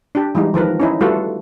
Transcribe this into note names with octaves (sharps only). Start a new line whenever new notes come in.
D4 G4
E3 G3 G#3 D#4
D#3 F3 A#4 B4
C#4 D#4 E4
G3 A3 F4 F#4 A4 B4